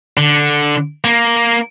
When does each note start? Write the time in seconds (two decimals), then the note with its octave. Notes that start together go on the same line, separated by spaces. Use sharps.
0.17 D3
1.04 A#3